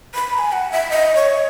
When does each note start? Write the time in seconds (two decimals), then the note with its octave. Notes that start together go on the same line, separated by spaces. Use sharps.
0.15 B5
0.33 A#5
0.38 G#5
0.52 F#5
0.72 E5
0.91 D#5
1.15 C#5